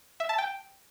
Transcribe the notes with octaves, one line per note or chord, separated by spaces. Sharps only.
E5
A5
G5